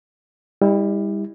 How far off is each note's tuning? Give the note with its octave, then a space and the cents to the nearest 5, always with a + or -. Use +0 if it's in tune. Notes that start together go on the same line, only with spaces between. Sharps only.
G3 +30 E4 -30